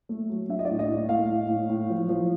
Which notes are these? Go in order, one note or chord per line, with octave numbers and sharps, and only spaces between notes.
A3
F#3
D4 E5
D#5
D5
A2
D#5
A2
A3 F5
A2
A2
A2
F3
F3